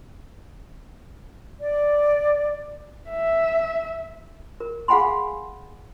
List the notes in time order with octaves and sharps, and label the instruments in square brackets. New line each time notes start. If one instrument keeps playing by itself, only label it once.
[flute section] D5
[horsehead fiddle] E5
[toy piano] A#4
G#4 F5 F#5 G#5 B5 C6